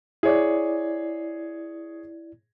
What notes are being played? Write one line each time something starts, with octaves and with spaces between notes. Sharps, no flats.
E4 G#4 C#5 D5